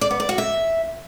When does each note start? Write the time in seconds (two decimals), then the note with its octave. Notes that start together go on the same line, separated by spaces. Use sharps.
0.01 D5
0.11 B3
0.20 D5
0.29 F#4
0.38 E5